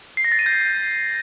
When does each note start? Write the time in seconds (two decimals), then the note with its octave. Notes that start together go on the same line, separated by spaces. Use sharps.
0.17 C7
0.24 A#6
0.32 A6
0.39 D#7
0.46 G6